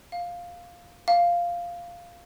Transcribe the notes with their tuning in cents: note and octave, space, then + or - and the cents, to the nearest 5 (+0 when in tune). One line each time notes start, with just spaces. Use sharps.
F5 +5
F5 -5